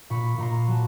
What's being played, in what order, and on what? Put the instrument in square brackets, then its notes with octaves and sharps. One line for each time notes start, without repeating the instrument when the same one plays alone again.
[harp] A#2 B5 C#6
A#2 A#5 C6
F#3 A5